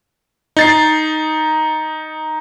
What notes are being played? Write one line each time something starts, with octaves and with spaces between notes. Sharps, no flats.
D#4 A6 C7